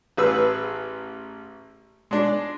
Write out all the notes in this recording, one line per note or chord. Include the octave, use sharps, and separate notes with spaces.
A1 G#4 B4 E6
G#3 D4